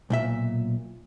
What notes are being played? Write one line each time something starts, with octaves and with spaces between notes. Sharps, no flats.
B1 A#2 E5